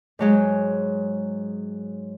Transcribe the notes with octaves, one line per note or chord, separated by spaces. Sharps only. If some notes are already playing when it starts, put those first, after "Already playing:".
G#2 F#3 G#3